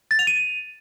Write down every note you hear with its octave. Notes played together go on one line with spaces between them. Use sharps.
A6
F7
D#7